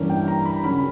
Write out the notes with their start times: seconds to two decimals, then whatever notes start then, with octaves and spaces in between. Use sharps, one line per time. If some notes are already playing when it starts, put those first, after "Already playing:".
Already playing: G2 E3 A#3 C#4
0.10 G5
0.28 A#5
0.45 B5
0.64 C#3 F#3 C#4 B5